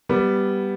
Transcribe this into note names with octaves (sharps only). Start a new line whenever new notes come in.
G3 B3